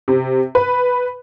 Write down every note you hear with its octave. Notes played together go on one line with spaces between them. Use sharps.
C3
B4